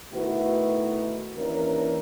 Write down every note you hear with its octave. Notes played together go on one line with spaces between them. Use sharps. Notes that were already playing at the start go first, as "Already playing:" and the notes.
B2 D#3 A3 E4 F#4 B4
D#2 E3 C#4 D4 A#4